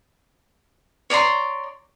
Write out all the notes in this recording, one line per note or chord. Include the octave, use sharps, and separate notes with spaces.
C#5 D5 A#5 C6